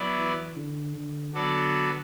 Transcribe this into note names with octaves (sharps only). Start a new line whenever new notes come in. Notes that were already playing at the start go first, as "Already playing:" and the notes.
Already playing: F#3 B3 E4 D5
E3
D3
D3
D3 F#3 B3 F#4 A4 D5